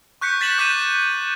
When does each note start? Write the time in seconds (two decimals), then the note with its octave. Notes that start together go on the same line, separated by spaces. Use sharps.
0.21 C#6 F#6 G6 B6 C#7
0.41 A6 B6 E7 F#7
0.58 D6 F#6 G6 B6 D#7 E7